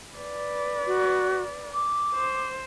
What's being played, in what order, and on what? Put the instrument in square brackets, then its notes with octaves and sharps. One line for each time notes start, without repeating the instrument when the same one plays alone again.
[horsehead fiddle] B4 D5
[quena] F#4
D6
[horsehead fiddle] C5